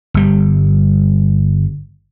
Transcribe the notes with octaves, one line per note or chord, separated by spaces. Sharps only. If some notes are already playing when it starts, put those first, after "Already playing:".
G1 G3